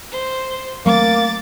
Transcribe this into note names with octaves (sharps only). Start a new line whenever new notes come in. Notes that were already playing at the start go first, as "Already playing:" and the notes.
C5
F#3 A3 A#3 C4 D6 A6